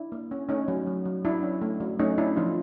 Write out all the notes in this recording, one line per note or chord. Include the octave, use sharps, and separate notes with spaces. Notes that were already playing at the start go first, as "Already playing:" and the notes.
Already playing: D4 E4
A#3
C#4
A3 C#4 D#4
F#3
F#3
F#3
F#3 D4 E4
C#4
A3
F#3
A3 C#4 D#4
C#4 D4 E4
F3 D#4 F4